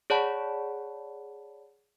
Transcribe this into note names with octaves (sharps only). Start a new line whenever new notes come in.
G#4 C#5 D5 F#5 A5 B5